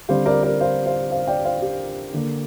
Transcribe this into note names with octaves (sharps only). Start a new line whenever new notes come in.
D3 G3 C4 C5 F5
A#4 D5
A#4 D5
C5 F5
C5 F5
C5 F5
D5 G5
C5 F5
G4
D3 A#3